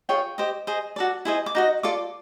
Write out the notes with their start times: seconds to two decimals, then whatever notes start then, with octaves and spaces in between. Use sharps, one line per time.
0.09 F4 G#4 C#5 G5
0.38 G4 C5 D#5
0.67 G#4 C5 D#5
0.96 F#4 A4 D5
1.25 E4 G#4 C5 D#5
1.46 D6
1.55 D#4 F#4 D#5
1.83 F4 A4 D5 D6